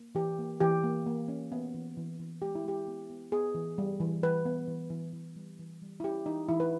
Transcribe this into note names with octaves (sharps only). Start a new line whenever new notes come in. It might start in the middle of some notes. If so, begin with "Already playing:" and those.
Already playing: A#3
E3 G4
A#3
E3 G4
A#3
A#3
C#4
B3
E3
E3
E3
G#3 G4
E4
G#3 G4
B3
B3
B3 G#4
E3
G3
E3
E3 B4
B3
E3
E3
E3
G3
E3
G3
E4
C#4 G4
E3 D#4
E3 E4
B4